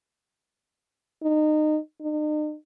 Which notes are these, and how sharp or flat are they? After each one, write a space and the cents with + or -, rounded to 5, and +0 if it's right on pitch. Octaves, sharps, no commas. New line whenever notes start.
D#4 -25
D#4 -45